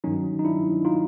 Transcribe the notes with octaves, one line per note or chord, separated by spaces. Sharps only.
G2 D#3 F#3 C#4 D#4
D#4
D4 E4
D#4 F4